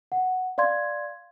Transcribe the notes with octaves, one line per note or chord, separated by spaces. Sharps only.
F#5
D5 F5 C6 G#6